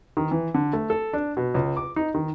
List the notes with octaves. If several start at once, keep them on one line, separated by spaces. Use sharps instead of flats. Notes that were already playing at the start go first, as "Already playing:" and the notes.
D#3
E3
D3
A3
A4
D4
B2
C#2
D6
D#4
D#3